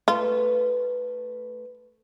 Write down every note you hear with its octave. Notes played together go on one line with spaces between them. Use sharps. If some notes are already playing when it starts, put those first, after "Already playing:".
A3 F4 B4